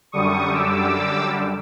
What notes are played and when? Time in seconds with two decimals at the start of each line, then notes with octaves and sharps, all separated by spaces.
0.12 F#2 D3 G3 C#6 D#6
0.52 D6 E6